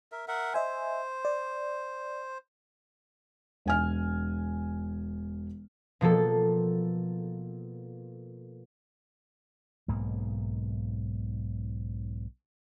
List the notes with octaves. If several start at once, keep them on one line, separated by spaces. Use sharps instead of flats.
A#4 E5
A#4 E5 F#5
C5 D#5 E5 G#5
D5
E1 G#5 F6
B2 F3 A#3 A4
B1 G#2 A#3